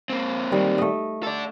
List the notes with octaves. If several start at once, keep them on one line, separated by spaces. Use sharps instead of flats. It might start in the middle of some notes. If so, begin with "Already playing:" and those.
A#3 C4
D#3 G3
A3 D#5
A4 D5